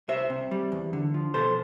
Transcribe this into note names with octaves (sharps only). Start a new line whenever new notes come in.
C2 C5 E5
C3
G3
E2
D3
F3
B2 A4 C5